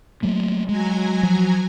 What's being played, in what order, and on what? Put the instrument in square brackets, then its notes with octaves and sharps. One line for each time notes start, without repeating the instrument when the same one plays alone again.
[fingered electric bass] F#3 A3 A#3
[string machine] F#3 G#5 A#5 [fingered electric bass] G#3
[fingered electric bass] F3